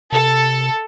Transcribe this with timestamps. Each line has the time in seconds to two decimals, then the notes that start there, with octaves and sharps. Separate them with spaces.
0.12 C3 A4